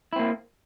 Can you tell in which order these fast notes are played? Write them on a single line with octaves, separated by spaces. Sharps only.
E4 C4 A#3